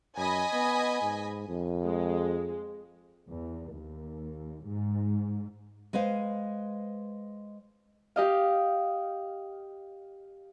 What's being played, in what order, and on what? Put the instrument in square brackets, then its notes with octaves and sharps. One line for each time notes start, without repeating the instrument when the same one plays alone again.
[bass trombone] F#2 [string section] D#5 G#5 B5
[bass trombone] B3
G#2
F2
[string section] G#3
[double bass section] E2
D#2
G#2
[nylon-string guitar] G#3 B4 C5 F5
[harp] G4 D#5 F5